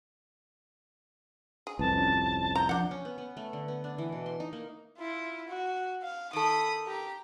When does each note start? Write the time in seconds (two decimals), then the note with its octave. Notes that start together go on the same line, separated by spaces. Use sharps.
1.67 G#4
1.79 C2 F2 B4 A5
1.97 G#1 C#4
2.55 A#5 G6
2.69 F3 D4 F#5
2.91 C#4
3.05 B3
3.18 B3
3.37 A3
3.53 D3
3.68 B3
3.84 D4
3.98 E3
4.12 B2
4.26 C6
4.40 D#4
4.53 A#3
4.98 E4 F4
5.48 F#4
6.03 F5
6.33 D#3 A4 B5 D#6
6.87 G4 A#5